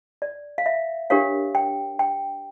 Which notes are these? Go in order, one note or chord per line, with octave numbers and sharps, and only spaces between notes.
D5
F5
E5
D4 G4 A#4 C#5 F5
G5
G5